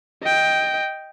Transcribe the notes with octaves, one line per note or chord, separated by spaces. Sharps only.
D#5 G5